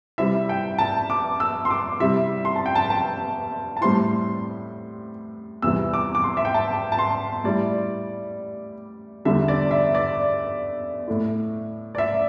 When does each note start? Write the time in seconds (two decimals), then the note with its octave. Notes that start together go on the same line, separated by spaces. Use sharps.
0.18 C3 G3 C4 E4 E5
0.49 G5
0.78 A5
1.10 D6
1.40 E6
1.65 C6
1.70 D6
2.00 C3 G3 E4 E5
2.45 C6
2.56 A5
2.66 G5
2.75 A5
2.90 A5
3.77 A5
3.81 A2 G3 C4 E4 C6
5.62 E2 C3 E3 G3 E4 E6
5.94 D6
6.15 D6
6.24 C6
6.37 E5
6.45 G5
6.54 A5
6.92 A5
6.99 C6
7.44 A2 G3 E4 D5
9.25 E2 D3 G3 E5
9.48 D5
9.71 E5
9.95 D5
11.08 A2 A3 E4
11.95 D5
11.98 E5